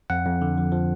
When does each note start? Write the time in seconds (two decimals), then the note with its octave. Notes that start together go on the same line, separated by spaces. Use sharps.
0.10 F2 F#5
0.26 F2
0.41 D3
0.58 F3
0.72 F3